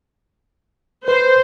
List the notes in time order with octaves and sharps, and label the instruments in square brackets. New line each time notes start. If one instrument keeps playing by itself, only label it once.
[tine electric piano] B4 [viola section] C5